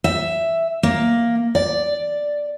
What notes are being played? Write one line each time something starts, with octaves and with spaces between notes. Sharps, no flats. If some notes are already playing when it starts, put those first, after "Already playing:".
E5
A#3
D5